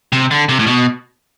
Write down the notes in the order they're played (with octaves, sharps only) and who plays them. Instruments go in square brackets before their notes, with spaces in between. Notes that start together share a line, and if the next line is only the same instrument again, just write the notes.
[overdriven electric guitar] C3
D3
C3
A2
B2